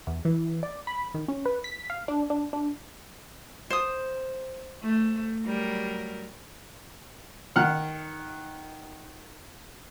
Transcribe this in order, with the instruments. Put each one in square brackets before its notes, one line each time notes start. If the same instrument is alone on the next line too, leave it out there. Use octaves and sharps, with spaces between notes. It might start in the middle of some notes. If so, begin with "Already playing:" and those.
[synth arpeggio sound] E2
E3
D5
B5
D#3
C#4
B4
B6
F5
D4
D4
D4
[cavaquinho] C5 D#6
[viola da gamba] A3
F#3 G3 A#4
[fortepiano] D#3 F#5 F6